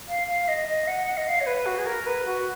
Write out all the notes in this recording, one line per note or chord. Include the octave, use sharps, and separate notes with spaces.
F5
F5
D#5
D#5
F#5
F#5
D#5
F5
C#5
B4
F#4
G#4
A#4
B4
F#4